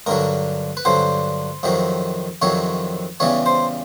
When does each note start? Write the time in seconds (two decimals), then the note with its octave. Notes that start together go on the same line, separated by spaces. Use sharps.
0.07 G2 D3 F#3 A#4
0.77 B4
0.85 G2 D3 F#3 C5
1.63 F2 C3 D#3 F#3
2.42 F2 C3 D#3 F#3 C#5
3.20 E2 C#3 E3 G3 C#5
3.46 C5